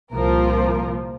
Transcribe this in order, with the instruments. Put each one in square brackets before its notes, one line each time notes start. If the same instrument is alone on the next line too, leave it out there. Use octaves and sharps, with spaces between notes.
[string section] C2 A#2 F3 A#4